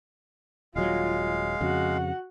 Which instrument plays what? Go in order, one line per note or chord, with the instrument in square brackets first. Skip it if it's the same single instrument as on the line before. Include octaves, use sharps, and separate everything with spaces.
[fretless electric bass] D#1 F#3 [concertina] G#3 F5 [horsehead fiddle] F4
[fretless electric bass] F2 C#3 [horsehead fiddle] F#4 F#5